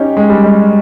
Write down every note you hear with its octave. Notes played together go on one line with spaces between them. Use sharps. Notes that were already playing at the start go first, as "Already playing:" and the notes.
Already playing: C#4 D#4 G4
G#3
G3
G#3